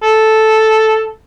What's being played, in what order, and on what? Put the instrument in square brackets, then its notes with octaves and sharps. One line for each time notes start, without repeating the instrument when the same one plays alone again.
[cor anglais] A4